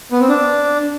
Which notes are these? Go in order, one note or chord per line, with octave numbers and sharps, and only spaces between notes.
B3
C4
D4